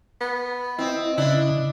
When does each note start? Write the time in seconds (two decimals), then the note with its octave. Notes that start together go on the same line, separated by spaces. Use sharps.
0.21 B3
0.79 C4 E4 D#5
1.18 C#3 D4 E4